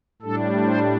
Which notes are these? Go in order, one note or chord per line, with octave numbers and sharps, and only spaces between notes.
A2 G3 D4 A4
C5